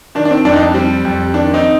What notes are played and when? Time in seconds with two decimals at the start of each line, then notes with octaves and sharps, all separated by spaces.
0.15 D#3 D4
0.25 D4
0.31 C4
0.45 F2 D4
0.53 D#4
0.60 D4
0.74 G3 C4
1.05 F2
1.34 D#3 D4
1.53 C4 D#4